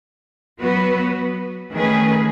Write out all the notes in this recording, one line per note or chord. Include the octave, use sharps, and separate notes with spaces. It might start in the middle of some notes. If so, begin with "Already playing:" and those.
F#3 B3 F#4 B4
D#3 A3 C#4 G#4 B4